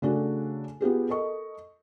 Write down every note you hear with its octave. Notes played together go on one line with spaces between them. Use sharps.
C#3 A3 D4 F#4 A4
B3 F4 G4 G#4
A4 A#4 D#5 C#6